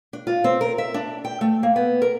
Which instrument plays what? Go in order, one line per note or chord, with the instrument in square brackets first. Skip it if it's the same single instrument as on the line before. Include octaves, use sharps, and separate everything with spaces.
[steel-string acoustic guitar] D4
F4
C4
A#4
E5
D4
G5
A3
A#3
B3
A#4